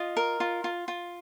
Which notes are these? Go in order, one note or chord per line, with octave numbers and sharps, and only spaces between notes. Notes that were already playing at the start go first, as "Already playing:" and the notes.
Already playing: F4 D#5
A#4
F4
F4
F4